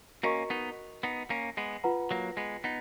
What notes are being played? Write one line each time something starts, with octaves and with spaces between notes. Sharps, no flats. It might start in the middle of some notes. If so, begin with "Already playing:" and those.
A#3 C#4 F#4 A#4 D#5 A#5 C#6
B3 D#4
B3 D#4
A#3 C#4
G#3 B3
F4 B4 F#5 A#5
F#3 A#3
G#3 B3
B3 D#4